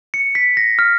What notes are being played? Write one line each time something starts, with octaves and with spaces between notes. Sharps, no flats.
C#7
B6
A#6
F6